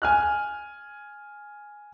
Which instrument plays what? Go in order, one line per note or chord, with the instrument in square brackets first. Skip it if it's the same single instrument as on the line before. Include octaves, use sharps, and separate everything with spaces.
[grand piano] G#5 F6 F#6